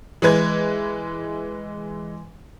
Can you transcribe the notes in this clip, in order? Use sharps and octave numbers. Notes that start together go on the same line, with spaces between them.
E3 G#3 B4 G#6